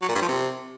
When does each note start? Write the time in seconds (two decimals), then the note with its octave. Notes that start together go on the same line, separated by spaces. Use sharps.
0.02 F#3
0.09 A#2
0.15 G2
0.22 F3
0.28 C3